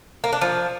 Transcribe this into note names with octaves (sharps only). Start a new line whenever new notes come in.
A#3
D4
F3